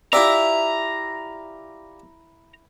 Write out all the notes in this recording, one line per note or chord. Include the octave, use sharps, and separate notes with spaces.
E4 F4 G4 D5 E5 A#5